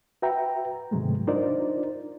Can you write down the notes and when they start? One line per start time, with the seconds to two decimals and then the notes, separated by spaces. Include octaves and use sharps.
0.22 F#4 B4 E5 G5 A#5
0.91 G#2 C3 D#3 F#3 G#3 A3
1.27 D4 D#4 F4 A#4 C5 D5